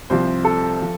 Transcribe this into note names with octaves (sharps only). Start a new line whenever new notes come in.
C2 C3 F3 C5
A4
F3